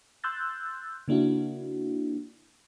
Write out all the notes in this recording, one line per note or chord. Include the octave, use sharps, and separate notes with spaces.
C6 E6 F#6 G6 A6
C#3 A#3 D4 E4 F#4